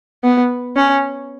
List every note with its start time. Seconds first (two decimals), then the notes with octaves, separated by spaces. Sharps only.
0.24 B3
0.76 C#4